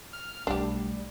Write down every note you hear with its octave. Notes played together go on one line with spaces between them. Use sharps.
F6
B1 G3 A3 D4 G4